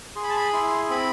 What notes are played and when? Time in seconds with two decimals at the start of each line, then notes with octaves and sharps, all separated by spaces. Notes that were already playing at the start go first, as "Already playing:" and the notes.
0.16 G#4 C6
0.23 B5
0.29 A5
0.37 B5
0.53 E4 C6
0.90 C4 B5